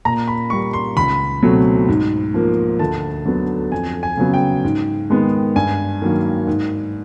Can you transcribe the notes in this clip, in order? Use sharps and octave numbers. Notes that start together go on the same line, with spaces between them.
A#2 A#5
B5
G3 A#3 C#6
C6
C#2 B5
B2 F#3 A3 C4
G#2
F3 A#3
D2 A5
D3 F#3 B3
F2 G#5
G#5
C#3 F#3 B3
G5
G#2
D#3 G#3 B3
G2 G#5
D#3 F#3 A#3
G#2